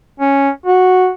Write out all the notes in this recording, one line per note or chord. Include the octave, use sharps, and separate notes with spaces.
C#4
F#4